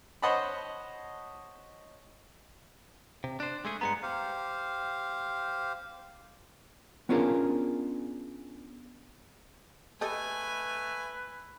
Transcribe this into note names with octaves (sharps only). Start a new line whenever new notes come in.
C5 C#5 D#5 F#5 A5 B5
C3
D4 C5
G#3 A3 G#4
G2 G#3 B3 A#5 C#7
G4 C5 F5
B3 C#4 D4 F4 G#4 A#4
A3 G4 A4 B4 D#5 G#5